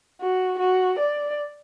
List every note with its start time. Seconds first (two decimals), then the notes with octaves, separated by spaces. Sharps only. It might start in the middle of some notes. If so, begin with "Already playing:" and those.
0.21 F#4
0.59 F#4
0.99 D5